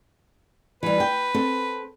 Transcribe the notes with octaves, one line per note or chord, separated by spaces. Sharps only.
E3 G3 B4
G5
C4 A4